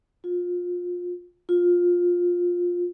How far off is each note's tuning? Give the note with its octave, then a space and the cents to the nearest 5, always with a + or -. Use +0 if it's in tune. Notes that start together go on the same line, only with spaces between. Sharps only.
F4 +25
F4 +15